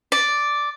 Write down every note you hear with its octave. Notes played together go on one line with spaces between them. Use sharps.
D5